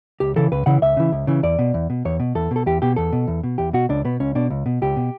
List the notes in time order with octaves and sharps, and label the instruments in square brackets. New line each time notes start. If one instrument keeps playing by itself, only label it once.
[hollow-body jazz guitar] C#2 G4
C#3 E3 A4
C#2 B4
C#3 E3 F#5
C#2 E5
C#3 E3
C#2
C#3 E3
E2 D5
B2
E2
B2
E2 C#5
B2
E2 A4
B2 A4
E2 G4
B2 G4
E2 A4
B2
E2
B2
E2 G4
B2 F#4
C#2 D4
B2 B3
C#2 C#4
B2 D4
C#2
B2
C#2 G4
B2